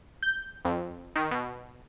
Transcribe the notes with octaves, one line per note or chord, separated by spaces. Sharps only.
G6
F2
D#3
B2